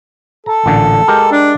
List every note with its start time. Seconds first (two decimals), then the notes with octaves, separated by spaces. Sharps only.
0.46 A4 A#5
0.66 A1 A#2 D3
1.08 G#3 G4 A#4
1.32 D4